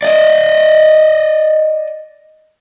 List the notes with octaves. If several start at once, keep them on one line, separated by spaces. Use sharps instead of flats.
D5 D#5